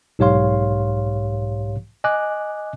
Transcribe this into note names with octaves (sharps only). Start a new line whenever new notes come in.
B1 G#2 G4 C#5 F5 C6
D#5 G#5 D6 F#6